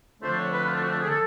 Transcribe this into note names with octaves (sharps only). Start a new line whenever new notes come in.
F2 D3 F3 A3 D4 C5
C#5
B4
F4
F#4
G#4
A4